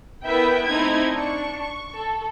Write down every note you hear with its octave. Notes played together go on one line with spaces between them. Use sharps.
B3 E4 A#4 B4 E5 G5
A3 C4 D#4 E4 G#6
D4 C#6
C#6
A4